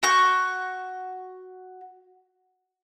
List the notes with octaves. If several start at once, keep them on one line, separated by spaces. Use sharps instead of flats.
F#4 C#6 G6